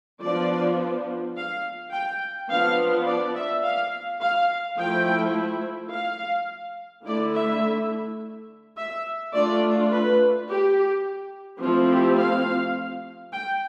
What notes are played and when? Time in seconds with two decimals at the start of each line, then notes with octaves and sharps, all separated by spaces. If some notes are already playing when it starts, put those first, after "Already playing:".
0.22 F3 B3 D4 F4 D5
1.36 F5
1.93 G5
2.50 F3 B3 D4 F5
3.08 D5
3.36 E5
3.64 F5
4.21 F5
4.78 F3 A3 E4 G5
5.92 F5
7.06 D3 A3 E4 D5
7.35 E5
8.77 E5
9.34 A3 D4 F4 D5
9.92 B4
10.49 G4
11.62 F3 A3 C4 E4 F4
11.91 G4
12.19 F5
13.33 G5